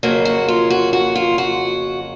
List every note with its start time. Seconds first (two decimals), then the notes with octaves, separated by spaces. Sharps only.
0.03 F2 C#3 F#3 A#3 F#4
0.25 F#4
0.48 F4
0.70 F#4
0.93 F#4
1.15 F4
1.38 F#4